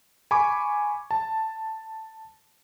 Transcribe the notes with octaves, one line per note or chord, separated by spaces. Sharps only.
G#5 B5 C#6 D6
A5